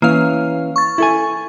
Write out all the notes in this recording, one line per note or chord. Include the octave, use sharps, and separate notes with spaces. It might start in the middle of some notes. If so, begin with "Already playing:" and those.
E3 A#3 C#4 F5
C#6 A6
E4 A4 G#5